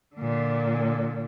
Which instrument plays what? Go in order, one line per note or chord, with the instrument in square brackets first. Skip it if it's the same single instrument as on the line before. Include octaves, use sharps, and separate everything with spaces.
[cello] A#2 D3